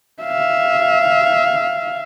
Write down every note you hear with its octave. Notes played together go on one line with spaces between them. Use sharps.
E5 F5